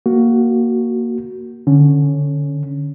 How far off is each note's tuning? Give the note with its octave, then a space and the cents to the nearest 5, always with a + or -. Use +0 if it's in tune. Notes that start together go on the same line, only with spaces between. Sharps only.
A#3 +0 F#4 +10
D3 +0 C#4 +0